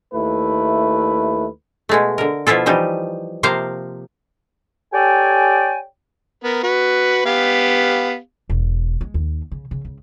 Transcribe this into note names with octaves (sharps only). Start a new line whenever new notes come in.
D#2 A3 E4 B4
B2 G#3 A3
D3 A#4
B2 F3 E4 F4 A4
E3 F3 G3 D#4
C3 F3 A#3 C5 F5 A#5
G4 A4 C#5 D5 G5 G#5
B3 A#4
F#4 B4
B3 G4 F5
E1
G#3
D#2
C#3
C#3
C#2